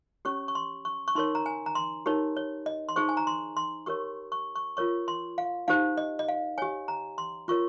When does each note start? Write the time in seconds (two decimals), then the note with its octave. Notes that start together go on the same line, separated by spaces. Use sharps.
0.25 C#4 G4 C#5 C#6
0.48 C#6
0.55 C6
0.85 C#6
1.08 C#6
1.15 D#4 A#4 C#5 C6
1.35 A#5
1.46 G#5
1.66 A#5
1.75 C6
2.06 D#4 G4 A#4 C#5
2.37 C#5
2.66 D#5
2.89 C6
2.96 D#4 G#4 C5 C#6
3.09 G#5
3.17 A#5
3.27 C6
3.57 C6
3.86 G4 A#4 C#5 C#6
4.32 C#6
4.55 C#6
4.77 F4 A#4 C#5 C#6
5.08 C6
5.38 F5
5.68 D#4 G4 C5 F5
5.97 D#5
6.19 D#5
6.29 F5
6.58 G4 C#5 G#5
6.88 A#5
7.18 C6
7.48 F4 A#4 C#5 C#6